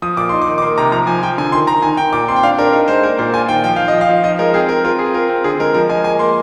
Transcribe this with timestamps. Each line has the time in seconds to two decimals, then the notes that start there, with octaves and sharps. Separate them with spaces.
0.02 F3 D#6
0.17 A#2 D6
0.29 D#4 C6
0.42 D6
0.48 D#3
0.58 D6
0.62 A#3 C6
0.78 C3 A#5
0.92 F3 A#5
1.07 F3 G#5
1.22 F3 G5
1.38 D3 G#5
1.52 D#3 C6
1.67 D#3 A#5
1.82 D#3 G#5
1.97 D#3 G5
2.13 A#2 D6
2.28 C4 C6
2.36 G5
2.43 D4 F5
2.58 D4 A#4
2.73 D#4 A#4
2.88 G#3 C5
3.03 A#3 A#4
3.19 A#2 C5
3.34 F4 G#5
3.49 D#3 G5
3.64 F3 G5
3.76 F3 F5
3.88 D#5
3.93 F3
4.01 F5
4.09 F3
4.24 D#4 D#5
4.39 G#3 A#4
4.54 C4 G#4
4.69 C4 A#4
4.84 F4 A#4
4.99 C4 G#4
5.14 F4 A#4
5.29 C4
5.44 D3 G#4
5.60 G#3 A#4
5.74 F3 A#4
5.90 G#3 G#5
6.04 A#3 G#5
6.19 A#3 C6